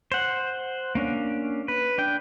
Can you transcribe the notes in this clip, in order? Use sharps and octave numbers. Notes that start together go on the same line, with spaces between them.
C5 F#5
A#3 C#4 D4
B4
D4 G5